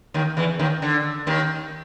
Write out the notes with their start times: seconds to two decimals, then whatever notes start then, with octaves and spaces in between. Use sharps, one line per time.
0.14 D#2 D#3
0.37 E2 E3
0.59 D#2 D#3
0.82 D3
1.27 D#2 D#3